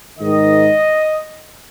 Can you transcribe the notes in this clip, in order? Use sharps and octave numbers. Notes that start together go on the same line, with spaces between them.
G#2 D#3 D#5